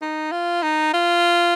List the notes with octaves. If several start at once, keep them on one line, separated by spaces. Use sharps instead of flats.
D#4
F4
D#4
F4